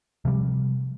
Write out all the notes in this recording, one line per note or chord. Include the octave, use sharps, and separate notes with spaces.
C3 F3 G3